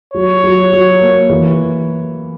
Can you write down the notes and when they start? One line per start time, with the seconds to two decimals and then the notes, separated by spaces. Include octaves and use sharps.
0.13 F#3 C#5
0.44 F#3
0.73 F#3
1.01 A#3
1.30 E3